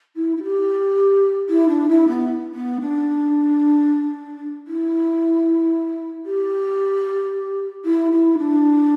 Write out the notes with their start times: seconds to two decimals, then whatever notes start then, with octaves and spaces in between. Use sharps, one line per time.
0.16 E4
0.36 E4
0.43 G4
1.49 E4
1.68 D4
1.88 E4
2.08 B3
2.54 B3
2.81 D4
4.67 E4
6.25 G4
7.85 E4
8.11 E4
8.38 D4